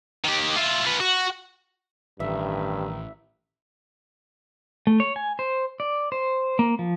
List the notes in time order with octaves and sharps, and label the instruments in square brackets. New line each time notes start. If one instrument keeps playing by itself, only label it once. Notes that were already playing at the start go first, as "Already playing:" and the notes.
[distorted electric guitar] D#3 G4
E4 F4
F4 B4
F#4
[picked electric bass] A1 [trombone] G2 [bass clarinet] D#3 [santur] E5
[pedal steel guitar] A3
C#5
G#5
C5
D5
C5
A#3
F3